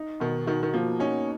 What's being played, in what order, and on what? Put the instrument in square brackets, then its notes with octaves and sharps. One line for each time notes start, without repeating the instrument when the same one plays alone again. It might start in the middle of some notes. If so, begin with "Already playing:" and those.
Already playing: [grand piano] D#4
[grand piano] B2 [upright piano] D#3
[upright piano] D#3 [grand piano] F#4
[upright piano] D#3
[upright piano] F3 [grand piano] A#3
[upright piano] C#4 [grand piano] D#4